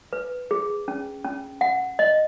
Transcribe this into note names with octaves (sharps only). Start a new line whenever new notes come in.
B4
G#4
C#4
C#4
F#5
D#5